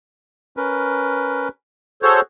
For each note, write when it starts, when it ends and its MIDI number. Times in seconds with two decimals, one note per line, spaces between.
0.57 1.48 61
0.57 1.48 70
0.57 1.48 71
2.03 2.21 66
2.03 2.21 68
2.03 2.20 69
2.03 2.20 72
2.03 2.20 73